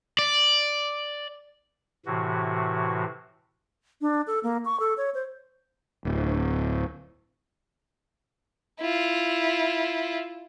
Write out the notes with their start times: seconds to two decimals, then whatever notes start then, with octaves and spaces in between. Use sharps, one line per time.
0.19 D5
2.06 A2 C3 E3 F#4
4.01 D4
4.27 A4
4.43 A#3
4.65 C#6
4.80 A4
4.97 C#5
5.14 C5
6.05 D1
8.80 E4 F4